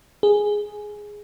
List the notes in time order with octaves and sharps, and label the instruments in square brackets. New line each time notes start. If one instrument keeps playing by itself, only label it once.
[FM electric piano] G#4